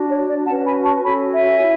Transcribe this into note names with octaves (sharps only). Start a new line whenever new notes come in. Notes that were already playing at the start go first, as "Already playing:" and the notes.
Already playing: D4 F#4
C#5
D5
C#4 F#4 B4 F#5 A5
G#5 B5
A5 C#6
C#4 F#4 A4 C#5 G#5 B5
E5 G#5
E4